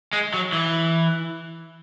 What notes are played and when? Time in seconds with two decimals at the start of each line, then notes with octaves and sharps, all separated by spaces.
0.13 G#3
0.34 F#3
0.53 E3